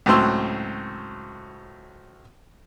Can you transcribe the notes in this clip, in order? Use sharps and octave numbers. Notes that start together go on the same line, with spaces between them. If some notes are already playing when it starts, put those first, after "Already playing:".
C#2 A2 F#3 C4 C6 E6